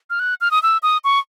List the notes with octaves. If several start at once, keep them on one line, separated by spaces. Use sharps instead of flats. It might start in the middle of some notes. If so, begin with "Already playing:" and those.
F6
F#6
F6
D#6
E6
D#6
C#6